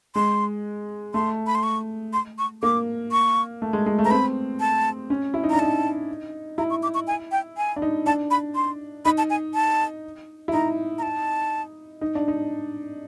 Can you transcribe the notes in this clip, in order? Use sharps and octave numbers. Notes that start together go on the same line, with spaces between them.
G#3 C6
A3 C6
B5
C6
C#6
C6
C#6
A#3 D6
C#6
A3
G#3
G#3
A3
B3 A#5
C4 B5
A5
C#4
E4
D#4
D4 A#5
D#4 A5
E4 A#5
C#6
D6
C#6
G#5
G5
G#5
D4
D#4
D4 A5
B5
C6
D#4 B5
A5
G#5
A5
E4
D#4 A#5
A#5
A5
D#4
D4
D#4